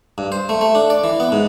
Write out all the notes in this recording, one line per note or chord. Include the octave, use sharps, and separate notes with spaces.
G2
C5
A3
A3
D4
D5
E3
B3
G#2